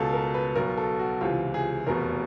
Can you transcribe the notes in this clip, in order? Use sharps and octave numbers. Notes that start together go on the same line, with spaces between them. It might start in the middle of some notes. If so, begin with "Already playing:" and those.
Already playing: C#2 B2 A4
A#4
B4
B1 B2 A#4
A4
F#4
C#2 C3 E3 F4
G#4
F1 E2 B2 A#4